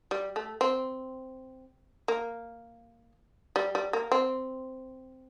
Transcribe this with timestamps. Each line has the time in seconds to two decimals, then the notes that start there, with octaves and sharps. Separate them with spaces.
0.11 G3
0.36 A3
0.61 C4
2.08 A#3
3.56 G3
3.75 G3
3.93 A#3
4.12 C4